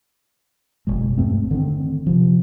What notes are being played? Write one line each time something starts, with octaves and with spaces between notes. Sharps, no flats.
F#1 B2 G#3
E2 G2 A3 C4
D3 D#3 C4
C3 F3